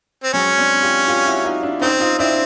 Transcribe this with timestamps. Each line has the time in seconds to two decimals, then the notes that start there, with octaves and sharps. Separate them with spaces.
0.23 C4
0.33 F#3 G#3 C#4
0.58 C4 D4
0.83 F4 G4
1.08 F4 G4
1.26 E4 F#4
1.45 D#4 F4
1.63 D4 E4
1.81 C4 C#4 D#4
2.00 D#4 F4
2.19 C4 D4 E4